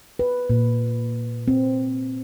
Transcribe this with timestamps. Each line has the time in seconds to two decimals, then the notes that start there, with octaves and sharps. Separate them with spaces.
0.19 B4
0.50 A#2
1.48 C4